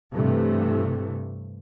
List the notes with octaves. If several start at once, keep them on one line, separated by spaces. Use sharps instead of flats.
G2 C3 E3 A3